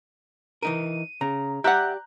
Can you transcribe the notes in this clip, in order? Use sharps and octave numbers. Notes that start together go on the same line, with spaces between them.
E3 D#4 A#4 D#7
C#3 A#5
G4 D5 E5 F#5 A#5 F#6 G6